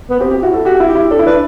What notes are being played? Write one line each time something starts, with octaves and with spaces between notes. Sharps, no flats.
B3
C4 G4
G4
E4 F#4
A4
F#4 G4
E4
G4
E4
D4 A4
E4
D4 B4